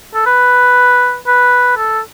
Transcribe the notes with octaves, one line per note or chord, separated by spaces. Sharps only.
A4
B4
B4
A4